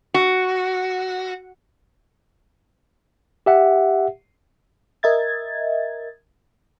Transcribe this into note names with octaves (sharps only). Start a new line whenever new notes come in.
F#4
G4 E5 F#5
A#4 D#5 E5 G#6 A6